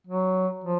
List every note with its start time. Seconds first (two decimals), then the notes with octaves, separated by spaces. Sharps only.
0.07 F#3
0.64 F3